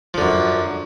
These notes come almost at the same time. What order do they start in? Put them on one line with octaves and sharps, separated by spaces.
F3 D3 F#2